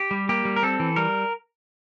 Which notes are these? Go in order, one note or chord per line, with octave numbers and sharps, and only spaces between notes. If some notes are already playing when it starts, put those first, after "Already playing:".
Already playing: G4
G3
A#3 G4
G3
A#4
C4 A4
E3
G3 A#4